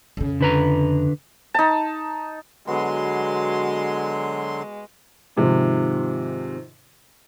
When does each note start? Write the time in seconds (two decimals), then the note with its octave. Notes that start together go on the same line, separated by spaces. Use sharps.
0.17 F2 C#3
0.41 D3 B4 A#5
1.54 D#4 A5
2.67 D3 F#3 G#3 B3 F#4 C6 D#6
5.37 G#2 C3 D#3 F3